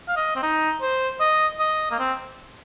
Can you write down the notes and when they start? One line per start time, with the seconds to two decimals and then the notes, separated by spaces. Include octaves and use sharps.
0.08 F5
0.16 D#5
0.36 C4
0.43 D#4
0.82 C5
1.20 D#5
1.60 D#5
1.91 A#3
1.99 C4